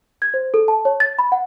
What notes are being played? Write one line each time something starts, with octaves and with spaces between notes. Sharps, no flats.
G#6
C5
A4
A5
C#5
A6
B5
F#5